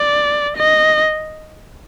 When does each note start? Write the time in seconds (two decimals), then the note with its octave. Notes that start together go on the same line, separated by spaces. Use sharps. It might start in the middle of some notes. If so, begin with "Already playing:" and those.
Already playing: D5
0.57 D#5